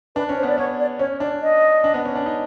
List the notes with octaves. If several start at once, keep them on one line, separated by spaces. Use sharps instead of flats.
D4 B4
C#4
C5
B3
D5
B3 C#5
D5
C#4 C#5
D4 D5
D#5
D4
B3
C#4
D4
D#4